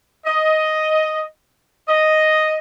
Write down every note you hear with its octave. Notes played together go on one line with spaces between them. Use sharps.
D#5
D#5